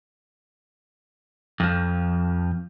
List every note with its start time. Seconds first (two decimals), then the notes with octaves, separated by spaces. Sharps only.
1.60 F2 F3